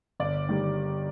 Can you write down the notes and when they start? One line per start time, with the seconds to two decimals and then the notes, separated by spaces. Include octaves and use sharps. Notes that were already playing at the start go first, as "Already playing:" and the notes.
0.20 G1 D5
0.49 D#3 G3